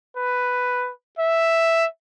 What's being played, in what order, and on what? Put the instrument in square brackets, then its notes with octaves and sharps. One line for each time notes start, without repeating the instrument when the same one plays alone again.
[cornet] B4
E5